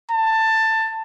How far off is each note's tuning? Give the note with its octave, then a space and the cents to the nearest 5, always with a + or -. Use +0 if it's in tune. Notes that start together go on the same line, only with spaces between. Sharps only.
A5 +15